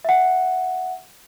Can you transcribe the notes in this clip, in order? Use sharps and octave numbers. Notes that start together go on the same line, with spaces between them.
E5 F#5